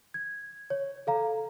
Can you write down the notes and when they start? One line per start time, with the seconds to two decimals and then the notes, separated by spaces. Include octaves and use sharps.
0.14 G#6
0.70 C#5
1.07 A4 F5 A#5